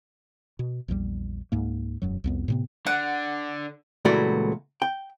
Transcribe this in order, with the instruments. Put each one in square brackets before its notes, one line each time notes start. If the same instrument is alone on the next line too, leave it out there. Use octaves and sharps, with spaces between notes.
[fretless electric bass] B2
A#1 E2 D#3 G3
C#2 G#2 A#3
E1 F#2 F#3
C2 F2 B3
A2 C3 B3
[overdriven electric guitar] D3 [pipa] F#5
[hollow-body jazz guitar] C#2 A#2 E3 A3 F#4 D5
G5